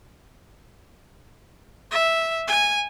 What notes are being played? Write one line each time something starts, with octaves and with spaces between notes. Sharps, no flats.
E5
G#5